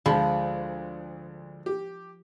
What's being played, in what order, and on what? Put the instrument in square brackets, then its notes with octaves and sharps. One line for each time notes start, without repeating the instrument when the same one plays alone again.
[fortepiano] D2 G#3 B5 [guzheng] F3
[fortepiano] G4